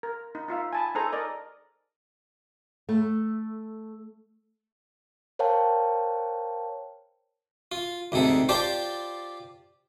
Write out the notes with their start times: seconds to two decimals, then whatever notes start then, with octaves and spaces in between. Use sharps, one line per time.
0.03 A#4
0.35 D#4
0.48 D#4 F4 E5 F5
0.73 G#5 A5 B5
0.95 D#4 G#4 A4 C5 G#5 A#5
1.13 A#4 D5 D#5
2.89 A3
5.39 A#4 C5 C#5 F5 G5 A5
7.72 F4
8.12 D2 G#2 C3 A4
8.49 F4 G4 C5 D5 A5